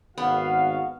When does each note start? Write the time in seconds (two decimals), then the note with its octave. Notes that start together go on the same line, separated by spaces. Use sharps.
0.18 G#1 B3 F#4 F5